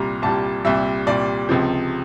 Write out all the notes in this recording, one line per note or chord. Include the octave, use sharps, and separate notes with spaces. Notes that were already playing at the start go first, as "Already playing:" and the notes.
Already playing: C2 A#2 G3 A#5
C2 A#2 G3 A5
C2 A#2 G3 E5
C2 A#2 G3 D5
C#2 C3 F3